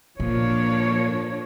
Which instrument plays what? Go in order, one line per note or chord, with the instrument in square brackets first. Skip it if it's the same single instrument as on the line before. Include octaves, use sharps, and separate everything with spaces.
[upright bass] A#2 [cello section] F3 D4 A#4 [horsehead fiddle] C#5